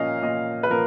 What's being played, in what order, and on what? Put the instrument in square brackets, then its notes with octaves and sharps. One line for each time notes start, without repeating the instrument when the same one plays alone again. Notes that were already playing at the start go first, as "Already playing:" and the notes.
Already playing: [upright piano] A#2 F3 A#3 C#4 D#5 F5
A#2 D#5
B4
F3 A#3 A#4